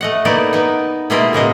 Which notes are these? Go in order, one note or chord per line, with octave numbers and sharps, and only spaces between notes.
A3 D#5 F#5
A#3 B3 D#4 E4 D5
B3 D#4
B2 G#3 A#3 E4 F4 D#5
A2 C#3 A#3 D#5